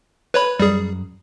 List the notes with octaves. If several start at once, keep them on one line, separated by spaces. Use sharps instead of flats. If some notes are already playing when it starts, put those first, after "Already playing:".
B4 C#5 B5
F#2 G3 G#4